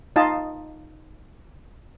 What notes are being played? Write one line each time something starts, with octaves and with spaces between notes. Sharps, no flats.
D#4 F4 D#5 A5